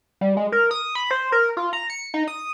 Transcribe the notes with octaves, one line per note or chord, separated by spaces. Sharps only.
G3
G#3
A#4
D#6
B5
C5
A#4
F4
A#5
C#7
D#4
D#6